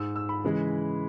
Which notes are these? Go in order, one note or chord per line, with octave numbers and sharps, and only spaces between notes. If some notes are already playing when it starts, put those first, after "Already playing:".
Already playing: G#2 G#3 E6
E6
B5
C#3 E3 G#3